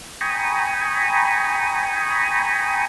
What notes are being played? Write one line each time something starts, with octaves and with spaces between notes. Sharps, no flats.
G5 G#5 A#5 B5 C#6 D#6